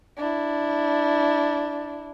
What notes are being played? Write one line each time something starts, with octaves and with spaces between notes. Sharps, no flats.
D4 E4